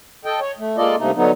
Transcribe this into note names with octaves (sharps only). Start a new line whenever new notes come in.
A4 D#5 G5
C#5
A3
G#3 A#3 F4 A4 D5 D#5
G2 C3 A3 A#3 D#4
D3 F#3 B3 D#4